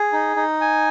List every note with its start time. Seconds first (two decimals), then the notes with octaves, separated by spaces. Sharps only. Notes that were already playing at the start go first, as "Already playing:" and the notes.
Already playing: G#4
0.13 D#4
0.36 D#4
0.61 G#5